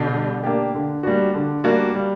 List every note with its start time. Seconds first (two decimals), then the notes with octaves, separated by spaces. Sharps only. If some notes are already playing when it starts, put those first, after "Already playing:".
Already playing: B2 D3
0.14 G3
0.44 A#3 D4 G4
0.74 D3
1.03 G3 A#3 D4 F#4
1.34 D3
1.64 G3 A#3 D4 F#4
1.95 G3